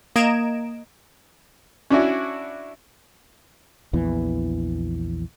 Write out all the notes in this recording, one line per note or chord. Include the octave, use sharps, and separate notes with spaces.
A#3 D#5 A#5 G#6 D7 E7
C#4 D4 E4 F#4
A#1 E2 E3